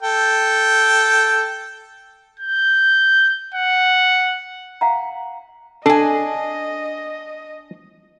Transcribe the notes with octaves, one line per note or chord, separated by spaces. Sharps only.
A4 G5
G6
F#5
F5 F#5 A#5
D4 A4 D#5 G#5